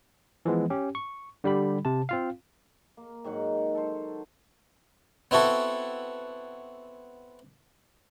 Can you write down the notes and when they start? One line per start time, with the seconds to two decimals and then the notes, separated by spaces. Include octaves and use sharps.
0.45 E3 F3 G#3 B3
0.70 C#4 G4
0.95 C#6
1.44 D3 G3 G4 B5
1.85 C3 A5
2.09 C4 F4 F5
2.97 A#3
3.24 G#2 D#3 F#3 F#5
3.75 A4 C5
5.31 B3 C4 E4 F#4 A4